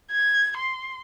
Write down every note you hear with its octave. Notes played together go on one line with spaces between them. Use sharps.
G#6
C6